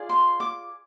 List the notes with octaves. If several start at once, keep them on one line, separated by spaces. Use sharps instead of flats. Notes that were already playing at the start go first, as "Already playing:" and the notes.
Already playing: F4 G#4 D5
C6
D6